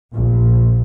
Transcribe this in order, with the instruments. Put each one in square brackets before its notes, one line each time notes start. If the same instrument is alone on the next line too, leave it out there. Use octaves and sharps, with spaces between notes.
[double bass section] A#1